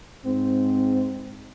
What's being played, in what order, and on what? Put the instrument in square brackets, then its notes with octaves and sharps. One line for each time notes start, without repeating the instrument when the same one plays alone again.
[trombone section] G#2 C4